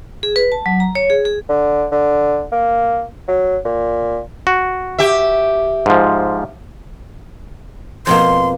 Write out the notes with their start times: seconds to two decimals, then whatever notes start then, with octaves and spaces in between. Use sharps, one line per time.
0.23 G#4
0.36 B4
0.52 A5
0.66 F#3
0.80 A#5
0.95 C#5
1.10 G#4
1.25 G#4
1.49 D3
1.92 D3
2.52 A#3
3.28 F#3
3.65 A#2
4.47 F#4
4.99 G4 E5
5.86 G#2 F3
8.07 F2 B2 A#3 C6